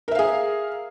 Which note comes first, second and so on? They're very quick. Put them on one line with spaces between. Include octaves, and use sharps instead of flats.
A#4 E5 F5 G#4